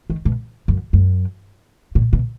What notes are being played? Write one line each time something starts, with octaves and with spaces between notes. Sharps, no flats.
D#3
B2
F#2
F#2
A#2
B2